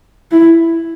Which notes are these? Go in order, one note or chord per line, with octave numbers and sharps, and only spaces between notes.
E4